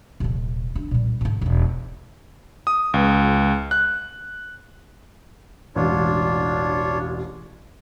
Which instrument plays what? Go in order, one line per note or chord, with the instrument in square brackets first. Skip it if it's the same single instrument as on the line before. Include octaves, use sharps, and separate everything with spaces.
[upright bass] D#1 C3
D4
A#2 G3
G#2 A3
E1 D#4
[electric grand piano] D#6
C#2
F#6
[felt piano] E1 A1 [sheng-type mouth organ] D4 F4 C#5